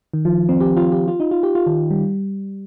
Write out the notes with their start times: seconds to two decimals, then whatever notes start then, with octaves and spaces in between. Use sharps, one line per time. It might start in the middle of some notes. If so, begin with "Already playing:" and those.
0.14 D#3
0.25 F3
0.49 C4
0.60 G4
0.77 F4
0.92 G4
1.08 F4
1.20 D#4
1.31 F4
1.43 G4
1.55 F4
1.67 D#3
1.90 G3